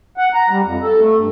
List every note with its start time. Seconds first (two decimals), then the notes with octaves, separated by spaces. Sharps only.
0.17 F#5
0.34 A#5
0.50 G3
0.65 F2
0.83 A4
1.00 A3
1.17 G2